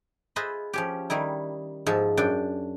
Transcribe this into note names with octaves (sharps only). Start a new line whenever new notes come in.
F4 G#4 B4 C5 D#5 E5
F3 C#4 G4
D#3 G3 E4
G#2 F3 E5 A5
F#2 D4 G5